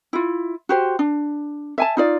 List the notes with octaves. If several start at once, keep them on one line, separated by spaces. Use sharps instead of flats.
E4 F4
F#4 G4 C5
D4
E5 G#5 A5
D#4 F4 D5